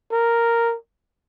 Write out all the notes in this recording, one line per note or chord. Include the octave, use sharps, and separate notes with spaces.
A#4